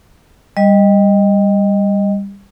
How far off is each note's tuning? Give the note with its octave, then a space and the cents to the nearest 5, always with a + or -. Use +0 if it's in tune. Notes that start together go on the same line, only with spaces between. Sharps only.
G3 +15 D#5 +0